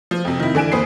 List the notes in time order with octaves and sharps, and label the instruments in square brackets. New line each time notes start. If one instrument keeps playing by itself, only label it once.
[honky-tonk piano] F3
F2 C3
D#3 E4
D3 E3 G#5 D7 E7
D#2 B4 C5 D#6 B6 C7